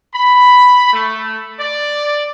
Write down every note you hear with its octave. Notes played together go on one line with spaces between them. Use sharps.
B5
A3
D5